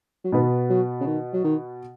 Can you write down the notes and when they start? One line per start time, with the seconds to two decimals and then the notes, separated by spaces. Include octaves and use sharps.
0.24 F#3
0.32 B2 D#3 B3 F#4 B4
0.70 F#3
1.01 C#3
1.07 D#3
1.33 F#3
1.44 D#3